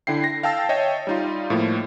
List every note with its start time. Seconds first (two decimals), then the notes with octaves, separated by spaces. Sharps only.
0.07 D3 E4 G5 C7
0.24 A#6
0.43 F5 G5 A5 E6 A6
0.69 C#5 D#5 E5 G5
1.07 G3 D#4 F4
1.50 A2 F3 A#3